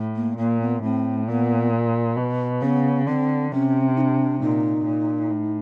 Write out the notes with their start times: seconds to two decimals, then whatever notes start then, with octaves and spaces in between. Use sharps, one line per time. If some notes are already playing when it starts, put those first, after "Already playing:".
Already playing: A2
0.16 A#3
0.38 A#2 A#3
0.61 B3
0.83 A2 C4
1.28 A#2 B3
2.17 B2
2.62 C#3 B3
3.07 D3 C4
3.52 C3 C#4
3.96 D#4
4.01 D4
4.40 A#2 D#4
4.85 A#2
5.31 A2